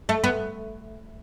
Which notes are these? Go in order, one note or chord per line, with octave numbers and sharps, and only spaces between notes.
A3
B3